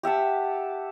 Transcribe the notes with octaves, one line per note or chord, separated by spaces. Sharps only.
G4 E5 F#5 A5